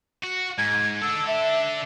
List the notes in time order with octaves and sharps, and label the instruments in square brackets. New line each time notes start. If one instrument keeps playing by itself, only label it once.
[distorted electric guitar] F#4
[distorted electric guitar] G#2 [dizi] G#6
[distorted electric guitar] D4 A4 [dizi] E6
[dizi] E5